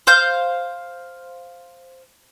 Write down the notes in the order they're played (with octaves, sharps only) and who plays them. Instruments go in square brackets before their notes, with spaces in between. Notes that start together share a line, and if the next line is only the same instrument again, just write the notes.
[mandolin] C5 F5 G6